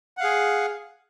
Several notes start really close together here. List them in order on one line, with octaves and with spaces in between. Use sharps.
F#5 F5 G#4